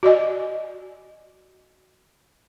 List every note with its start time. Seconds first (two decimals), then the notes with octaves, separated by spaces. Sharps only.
0.03 F#4 D5 D#5 G#5